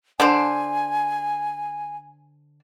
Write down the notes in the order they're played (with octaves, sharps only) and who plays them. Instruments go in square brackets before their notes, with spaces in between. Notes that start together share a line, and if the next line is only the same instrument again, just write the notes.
[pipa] D3 D4 C5 [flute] G#5